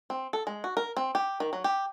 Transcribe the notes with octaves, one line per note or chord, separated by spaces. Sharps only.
C4
A4
G#3
F#4
A#4
C4
G4
D#3
F#3
G4